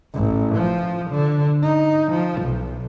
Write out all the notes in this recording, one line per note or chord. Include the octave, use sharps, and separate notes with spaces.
A1
F3
D3
D#4
F3
B1